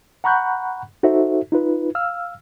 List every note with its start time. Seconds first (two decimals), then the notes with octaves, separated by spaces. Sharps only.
0.24 F#5 A#5 B5 C#6 F#6 G6
1.03 D#4 F#4 A4 C5 E5
1.52 D#4 F4 B4
1.95 F5 E6 F6